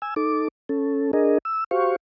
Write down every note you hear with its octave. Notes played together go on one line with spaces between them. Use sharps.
G#5 E6
D#4 A4 D6
C#4 A4
D4 G#4 A#4 D#5
E6
F#4 G4 C5 F5 C#6